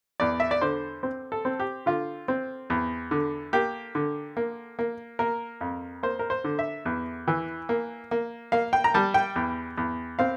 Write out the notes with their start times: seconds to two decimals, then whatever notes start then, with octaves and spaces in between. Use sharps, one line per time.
0.20 E2 D5
0.40 E5
0.51 D5
0.61 D3 C5
1.03 C4
1.32 A4
1.45 C4
1.60 G4
1.86 D3 F4
2.28 C4
2.70 E2
3.11 D3
3.53 A#3 G4
3.95 D3
4.37 A#3
4.79 A#3
5.19 A#3 A#4
5.61 F2
6.03 A#3 C5
6.19 A#4
6.30 C5
6.44 D3
6.59 E5
6.85 E2
7.28 E3
7.69 A#3
8.11 A#3
8.52 A#3 F5
8.73 G5
8.84 A#5
8.94 G3 A5
9.14 G5
9.36 E2
9.77 E2
10.19 C4 F5